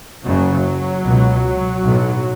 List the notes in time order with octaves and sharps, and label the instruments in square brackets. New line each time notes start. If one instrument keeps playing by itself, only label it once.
[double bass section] F#1 F#2 C#3 F#3
C#2 B2
B1 A2